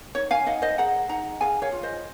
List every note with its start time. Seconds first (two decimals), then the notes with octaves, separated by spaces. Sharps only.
0.15 D#4 C#5
0.31 F5 G#5
0.46 D#4 D#5 F#5
0.62 C5 D#5
0.78 G#4 F#5 A#5
1.09 D#4 F#5 A#5
1.41 G#4 F5 G#5
1.62 C#5 F5
1.72 F4
1.83 C5 D#5